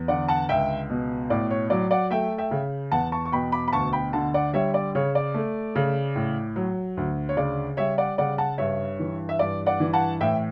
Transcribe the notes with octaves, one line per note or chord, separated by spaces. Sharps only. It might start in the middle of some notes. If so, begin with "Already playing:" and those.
Already playing: E2
D3 D5 F#5
F#5 A5
C#2 E5 G5
B2
A2 D5
C#5
F#3 D5
D5 F#5
A3 E5 G5
E5 G5
C#3
E2 F#5 A5
A5 C#6
C#6
B2 G5 B5
B5 D6
B5
D2 A5 C#6
G5 B5
D3 F#5 A5
D5 F#5
G3 C#5 E5
D5
C#3 C#5
D5
A3
C#3
A2
F#3
D2
C#5
C#3 D5
G3 C#5 E5
D5 F#5
C#3 D5 F#5
F#5 A5
G2 C#5 E5
E3
E5
G2 D5
D5 F#5
E3
F#5 A5
A2 E5 G5